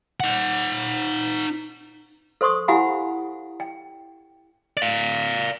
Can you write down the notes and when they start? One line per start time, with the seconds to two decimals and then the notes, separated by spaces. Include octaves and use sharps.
0.20 D#4 F#5
2.41 A4 C5 C6 C#6 D#6
2.68 E4 G4 F5 F#5 G#5 B5
3.60 G5
4.77 D5 F5